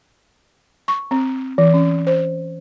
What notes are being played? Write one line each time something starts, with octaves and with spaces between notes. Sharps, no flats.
C#6
C4
E3
C#4
C5